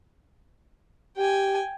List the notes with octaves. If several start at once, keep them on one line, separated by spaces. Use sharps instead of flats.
G4 G5 G#5